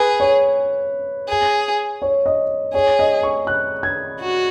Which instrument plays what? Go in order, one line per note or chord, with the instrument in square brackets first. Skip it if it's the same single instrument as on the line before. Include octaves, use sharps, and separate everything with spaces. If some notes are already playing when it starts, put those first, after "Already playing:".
Already playing: [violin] G#4 [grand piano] B4
[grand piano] C#5
[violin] G#4
[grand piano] C#5
D#5
[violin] G#4 [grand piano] C#5
[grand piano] D#5
C#6
F#6
G#6
[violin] F#4